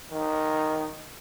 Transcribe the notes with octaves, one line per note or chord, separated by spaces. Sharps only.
D#3